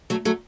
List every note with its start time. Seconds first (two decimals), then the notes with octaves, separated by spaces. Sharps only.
0.10 F#3 A3
0.25 F#3 A3